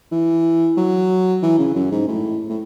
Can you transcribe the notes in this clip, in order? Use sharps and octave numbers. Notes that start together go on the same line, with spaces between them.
E3
F#3
E3
C#3
F#2
G#2
A2
A2